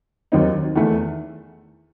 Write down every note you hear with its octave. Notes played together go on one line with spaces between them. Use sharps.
D#2 D#3 F#3 C4 D#4
E2 D#3 A3